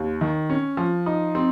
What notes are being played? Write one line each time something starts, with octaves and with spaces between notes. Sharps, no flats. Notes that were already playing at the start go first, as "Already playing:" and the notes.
Already playing: D#2
D#3
C#4
F3
D#4
C4